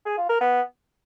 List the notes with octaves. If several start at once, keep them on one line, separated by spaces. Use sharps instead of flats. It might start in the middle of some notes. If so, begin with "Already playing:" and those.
G#4
F4
A#4
B3